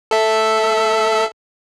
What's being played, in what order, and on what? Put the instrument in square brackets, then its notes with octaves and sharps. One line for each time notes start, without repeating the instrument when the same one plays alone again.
[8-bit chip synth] A4 E5